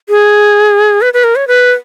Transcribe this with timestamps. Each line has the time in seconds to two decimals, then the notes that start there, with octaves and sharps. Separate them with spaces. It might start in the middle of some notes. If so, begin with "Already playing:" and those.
0.09 G#4
1.02 B4
1.14 B4
1.24 A#4
1.36 C#5
1.48 B4